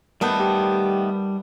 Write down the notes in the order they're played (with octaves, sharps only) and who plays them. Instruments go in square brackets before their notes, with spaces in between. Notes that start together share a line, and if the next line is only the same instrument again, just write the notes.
[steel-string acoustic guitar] D#3 A3 B3 [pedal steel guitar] G3 A5 G6
[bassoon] G4